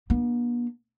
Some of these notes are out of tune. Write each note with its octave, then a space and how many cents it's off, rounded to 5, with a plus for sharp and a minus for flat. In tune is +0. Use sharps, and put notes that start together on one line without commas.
B3 -45 D4 +20